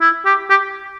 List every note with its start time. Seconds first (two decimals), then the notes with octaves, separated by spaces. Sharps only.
0.01 E4
0.25 G4
0.50 G4